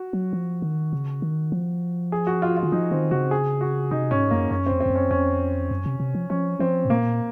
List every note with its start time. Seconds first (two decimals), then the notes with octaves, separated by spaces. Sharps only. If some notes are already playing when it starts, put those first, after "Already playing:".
Already playing: F#4
0.13 F#3
0.33 F3
0.62 D#3
0.93 C#3
1.22 D#3
1.52 F3
2.12 G#4
2.27 F#4
2.42 F4
2.57 F4
2.63 D#3
2.72 F3 D#4
2.91 D#3 C4
3.11 C#3 F#4
3.31 G#4
3.61 F#4
3.91 C3 D#4
4.11 G#2 C#4
4.31 F#2 A#3
4.51 F#2 C#4
4.66 F2 C4
4.81 C4
4.86 F2
4.90 F#2
4.96 C#4
5.11 F2 C#4
5.71 F#2
5.86 C3
6.00 C3
6.15 F3
6.30 F3 C#4
6.59 F3 C4
6.85 G#2
6.90 A#2 A#3